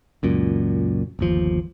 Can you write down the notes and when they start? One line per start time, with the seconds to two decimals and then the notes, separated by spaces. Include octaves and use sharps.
0.23 C#2 F#2 A#2
1.19 G1 D#2 F3